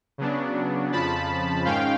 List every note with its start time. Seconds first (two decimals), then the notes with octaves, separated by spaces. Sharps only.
0.18 C#3 F#3 B3 D4
0.92 F2 C#3 F3 A5 B5
1.65 G#2 D#3 G#3 C#4 F5 G5